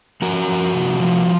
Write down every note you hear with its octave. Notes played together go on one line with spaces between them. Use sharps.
F3 F#4 A#4
F3
C3
F3